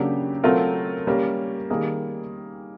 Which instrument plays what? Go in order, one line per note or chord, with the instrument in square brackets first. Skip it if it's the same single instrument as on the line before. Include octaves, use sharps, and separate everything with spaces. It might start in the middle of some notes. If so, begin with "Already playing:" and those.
Already playing: [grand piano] C#3 F#3 A#3 D4 G4
F#3 A3 C4 F4 A#4
G3 A#3 C#4
D#3 G3 A#3 D#4 G#4